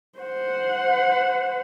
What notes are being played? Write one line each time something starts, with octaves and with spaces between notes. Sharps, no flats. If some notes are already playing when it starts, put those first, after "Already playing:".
C5 F#5